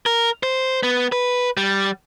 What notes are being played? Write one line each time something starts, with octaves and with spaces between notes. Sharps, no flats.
A#4
C5
B3
B4
G3